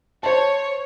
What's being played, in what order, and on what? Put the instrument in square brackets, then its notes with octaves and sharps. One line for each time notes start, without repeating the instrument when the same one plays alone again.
[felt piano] C5 A5 [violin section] C#5